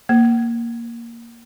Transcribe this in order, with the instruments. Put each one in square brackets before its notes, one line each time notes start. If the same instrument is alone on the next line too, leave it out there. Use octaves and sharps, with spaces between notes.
[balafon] A#3